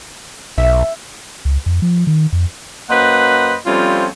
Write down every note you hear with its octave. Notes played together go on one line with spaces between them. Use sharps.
B1 E5
C#2
F2
F3
D#3
F2
F#2 A#3 B4 C5 D#5 F#5
F3 G3 A3 C4 C#4 F4